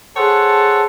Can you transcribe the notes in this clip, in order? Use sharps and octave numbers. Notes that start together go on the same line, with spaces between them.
G#4 A4 C5 C#5 F#5 A5